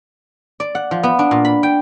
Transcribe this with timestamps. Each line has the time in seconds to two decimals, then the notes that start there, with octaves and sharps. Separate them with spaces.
0.60 D5
0.75 F#5
0.91 F3
1.03 B3
1.19 D4
1.31 A#2
1.45 B5
1.63 G5